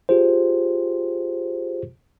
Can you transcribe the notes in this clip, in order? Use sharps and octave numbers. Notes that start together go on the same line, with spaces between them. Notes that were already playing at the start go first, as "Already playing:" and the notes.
F4 G4 G#4 C5